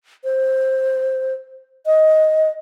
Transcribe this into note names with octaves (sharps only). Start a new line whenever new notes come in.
C5
D#5